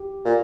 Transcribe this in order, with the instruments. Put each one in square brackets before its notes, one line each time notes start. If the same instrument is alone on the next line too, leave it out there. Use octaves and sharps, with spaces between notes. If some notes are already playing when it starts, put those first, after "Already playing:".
Already playing: [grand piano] G4
[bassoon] A#2